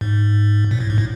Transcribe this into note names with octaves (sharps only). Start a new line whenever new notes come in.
G#2
A#2
A2
G#2
A2